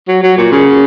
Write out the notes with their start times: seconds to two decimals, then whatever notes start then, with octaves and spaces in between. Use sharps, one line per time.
0.08 F#3
0.23 F#3
0.37 A#2
0.52 C#3